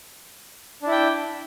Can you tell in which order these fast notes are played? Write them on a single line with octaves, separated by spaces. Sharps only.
D4 E4 G5